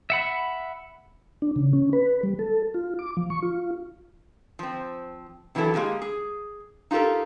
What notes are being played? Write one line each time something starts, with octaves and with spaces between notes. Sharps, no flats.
E5 F#5 B5
D4
C#3
C#4
B4
G3
A4
F4
D6
F3
C#6
F4
F3 C4
C3 E3 F#3 C4 E4 A4
G#3 A#3 G4 G#4
G#4
D#4 F4 G4 A4 A#4